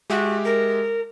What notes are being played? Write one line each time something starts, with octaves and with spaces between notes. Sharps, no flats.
G#3 F#4 G4 E5
A#4